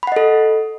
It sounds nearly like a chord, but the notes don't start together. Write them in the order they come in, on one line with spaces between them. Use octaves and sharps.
B5 F#5 D#5 A4